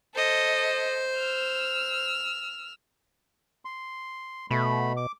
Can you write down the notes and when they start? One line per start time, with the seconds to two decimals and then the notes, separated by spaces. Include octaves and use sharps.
0.15 A4 C5 D#5
1.17 E6 F6
3.65 C6
4.51 B2 A3 B5
4.97 D6